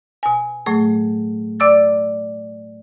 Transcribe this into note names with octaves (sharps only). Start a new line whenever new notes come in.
B2 G#5
A2 F#3 A3 G#4
D5 D6 E6 A6